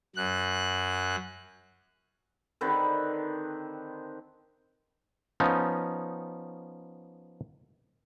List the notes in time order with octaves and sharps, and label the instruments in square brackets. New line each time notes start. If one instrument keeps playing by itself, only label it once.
[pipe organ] F#2 F#6
[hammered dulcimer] D3 D#3 C4 B4
[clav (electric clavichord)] F3 B3 C#4 D#4